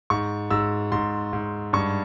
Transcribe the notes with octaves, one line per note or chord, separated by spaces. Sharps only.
G#2 C#6
G#2 E6
G#2 C6
G#2
G2 C#6